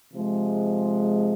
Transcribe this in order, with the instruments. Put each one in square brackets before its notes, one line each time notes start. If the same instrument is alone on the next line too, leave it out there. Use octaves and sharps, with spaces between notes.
[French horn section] C3 F3 G#3